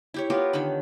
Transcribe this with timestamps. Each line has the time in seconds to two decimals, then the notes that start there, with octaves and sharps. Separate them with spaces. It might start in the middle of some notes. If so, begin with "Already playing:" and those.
0.14 E4 G4 C#5
0.30 B3 F4 G4 A#4
0.53 D3 D#3 C#5 B5